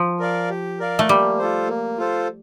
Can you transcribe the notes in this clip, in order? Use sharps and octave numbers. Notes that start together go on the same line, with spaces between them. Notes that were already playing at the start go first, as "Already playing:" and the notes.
Already playing: F3
A#4 D5 F5
G4
A#4 D5 F5
A3
G3 A#3
F4 A4 C5
A#3
F4 A4 C5